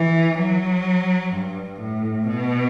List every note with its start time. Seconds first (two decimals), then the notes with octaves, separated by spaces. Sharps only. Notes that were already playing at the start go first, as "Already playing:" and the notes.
Already playing: E3
0.39 F#3
1.33 G2
1.80 A2
2.28 B2